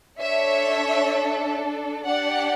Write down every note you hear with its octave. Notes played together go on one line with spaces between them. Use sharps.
D4 A4 C#5 E5
D4 G4 D5 F#5